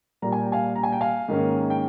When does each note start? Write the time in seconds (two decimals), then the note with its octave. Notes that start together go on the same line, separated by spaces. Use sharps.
0.22 A#2 G3 A#3 A#5
0.32 G#5
0.42 G5
0.52 F5 G#5
0.75 A#5
0.83 G#5
0.92 G5
1.01 F5 G#5
1.28 G#2 D#3 A#3 C#4
1.70 G5